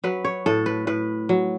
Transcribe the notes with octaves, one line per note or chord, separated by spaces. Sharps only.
F#3 B4
C#5
A2 A4
B4
A2 B4
F#3